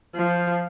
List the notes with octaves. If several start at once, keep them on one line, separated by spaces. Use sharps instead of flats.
F3